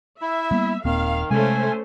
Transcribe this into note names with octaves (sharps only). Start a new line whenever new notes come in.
E4 E5
G3 A#3 B3
D#1 D#3 A#3 C4 F5
C3 G#3 A3 C#4 C5 G#5